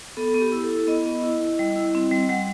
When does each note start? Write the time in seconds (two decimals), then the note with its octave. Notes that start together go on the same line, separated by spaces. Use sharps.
0.17 B3 A4
0.35 B3
0.41 G4
0.52 E4
0.63 A4
0.70 E4
0.87 B3 D#5
1.06 B3
1.24 E4
1.41 E4
1.59 G3
1.76 E4
1.95 C4
2.11 G3
2.29 G3 F#5